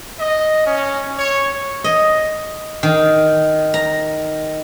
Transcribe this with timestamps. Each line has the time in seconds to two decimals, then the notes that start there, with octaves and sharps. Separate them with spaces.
0.18 D#5
0.65 C#4
1.17 C#5
1.84 D#5
2.83 D#3
3.74 A#5